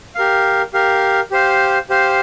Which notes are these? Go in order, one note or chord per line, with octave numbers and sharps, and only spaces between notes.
G4 A#4 F5
G4 A#4 F5
G4 C5 F5
G4 C5 F5